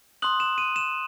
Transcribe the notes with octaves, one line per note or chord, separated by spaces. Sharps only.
C6 D#6 F#6 F#7
E7
D#7
E7